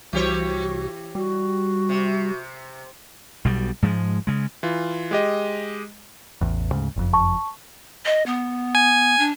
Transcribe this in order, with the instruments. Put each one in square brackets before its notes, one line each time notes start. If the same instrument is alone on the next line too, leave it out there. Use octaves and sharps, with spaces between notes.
[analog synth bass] C2 [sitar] E3 G4 C#5 [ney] F#4
[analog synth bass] G3 [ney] F#4
[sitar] C3
[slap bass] B1 B2 G3
G#2 F3 F#3 G#3
C#3 G#3
[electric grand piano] E3 F4
G#3 G4 D#5
[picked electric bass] A1 E2
D2 G#2 C#3
F#1 F2
[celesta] A5 C#6
[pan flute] D#5
B3
[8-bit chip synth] G#5
[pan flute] D4